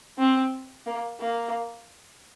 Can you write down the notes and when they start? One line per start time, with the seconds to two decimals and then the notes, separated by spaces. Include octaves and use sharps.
0.19 C4
0.86 A#3
1.20 A#3